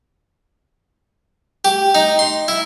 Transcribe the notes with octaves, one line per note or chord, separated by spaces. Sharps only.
G4
D#4
C6
E4